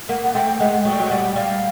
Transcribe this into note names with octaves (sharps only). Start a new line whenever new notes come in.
A#3 F#5
F#5
A3 G5
G#3 F#5
F#3 G5
G3
F#3
G5
G3 F#5
G3 F5